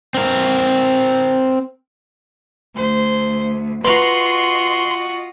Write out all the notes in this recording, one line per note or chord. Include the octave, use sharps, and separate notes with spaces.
C4 A#4
D2 C5
F4 F#4 B4 D#5 A#5 C6